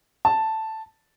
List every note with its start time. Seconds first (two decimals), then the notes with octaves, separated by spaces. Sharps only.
0.25 A5